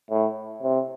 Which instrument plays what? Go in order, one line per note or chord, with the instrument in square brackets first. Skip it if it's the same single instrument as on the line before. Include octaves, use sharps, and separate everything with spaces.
[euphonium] A2
C3